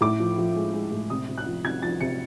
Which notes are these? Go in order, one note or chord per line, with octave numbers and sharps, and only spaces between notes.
A2 D6
F3
F3
G#3
G#3
A2
C3 D#6
C3
F#6
F3
C3 G#6
F3 A6
C3 C#7